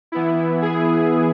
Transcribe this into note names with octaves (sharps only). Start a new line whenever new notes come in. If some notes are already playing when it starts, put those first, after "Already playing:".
E3 B3 E4
G#4